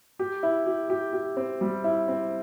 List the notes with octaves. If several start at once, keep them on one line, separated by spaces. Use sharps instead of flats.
G4
E4
G4
G4
G4
C4
G3
E4
C4